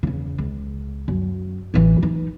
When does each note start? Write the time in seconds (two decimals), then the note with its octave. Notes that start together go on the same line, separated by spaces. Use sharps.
0.03 E2 C#3
0.38 C#2
1.08 F#2
1.74 A1 E3
2.03 E3 D#4